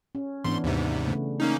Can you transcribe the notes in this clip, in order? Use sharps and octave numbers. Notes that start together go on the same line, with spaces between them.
C#4
G#2 E3 B3 D4 C6
D#2 G#2 C3
C#3 A3
A#3 C#4 D#4